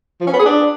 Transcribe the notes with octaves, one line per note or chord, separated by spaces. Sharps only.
F3
C#4
B3
G#4
D4